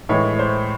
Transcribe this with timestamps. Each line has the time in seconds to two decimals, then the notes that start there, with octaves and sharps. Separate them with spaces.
0.09 A2 E3 G#3 C#5
0.39 C5